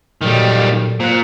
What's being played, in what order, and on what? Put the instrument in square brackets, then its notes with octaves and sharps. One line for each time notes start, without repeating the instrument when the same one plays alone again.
[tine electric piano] A#2 F#3 A4 [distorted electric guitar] D#3 G3
[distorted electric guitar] A#2 [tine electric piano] C5 F#6